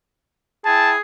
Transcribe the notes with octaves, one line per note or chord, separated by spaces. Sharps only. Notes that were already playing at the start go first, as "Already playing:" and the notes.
E4 G#4 G5 A5